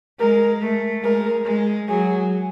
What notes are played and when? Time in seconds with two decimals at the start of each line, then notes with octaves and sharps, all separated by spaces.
0.19 G#3 A#4
0.62 A3
1.03 G#3 A#4
1.45 G#3
1.88 F#3 G#4